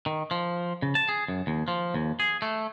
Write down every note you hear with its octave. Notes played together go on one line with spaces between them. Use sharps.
D#3
F3
C#3
A5
G#4
F#2
D#2
F3
D#2
G#4
A3